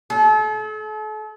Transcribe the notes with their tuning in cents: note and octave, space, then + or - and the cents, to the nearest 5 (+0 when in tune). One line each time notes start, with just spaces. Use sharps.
A4 -40